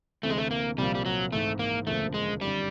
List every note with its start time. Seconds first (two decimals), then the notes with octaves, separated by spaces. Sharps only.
0.23 D2 C3 E3 A3
0.30 G#3
0.38 A3
0.51 A#3
0.78 C2 A#2 F3 G3 A#3
0.95 G3
1.06 F#3
1.32 G#1 G#2 E3 A3
1.59 A#3
1.87 E1 D2 C#3 F3 A3 A#3
2.14 G#3
2.41 G1 F#2 D#3 G3